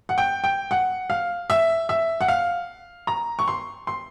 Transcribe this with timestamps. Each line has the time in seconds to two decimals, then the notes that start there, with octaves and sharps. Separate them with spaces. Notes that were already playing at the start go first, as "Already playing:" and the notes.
0.09 F#5
0.18 G5
0.44 G5
0.71 F#5
1.10 F5
1.50 E5
1.89 E5
2.21 F#5
2.28 F5
3.07 A#5
3.39 C#6
3.48 C6
3.87 C6